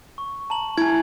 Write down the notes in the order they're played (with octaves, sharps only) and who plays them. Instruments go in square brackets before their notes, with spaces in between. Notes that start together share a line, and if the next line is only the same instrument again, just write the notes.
[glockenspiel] C#6
A5 A#5 F#7
[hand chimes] E4 [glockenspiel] G#5 G#6